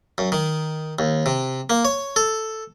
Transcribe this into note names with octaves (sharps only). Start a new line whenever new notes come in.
F#2
D#3
D#2
C3
A#3
C#5
A4